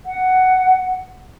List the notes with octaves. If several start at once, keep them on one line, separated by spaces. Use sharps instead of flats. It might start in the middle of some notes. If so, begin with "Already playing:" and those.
F#5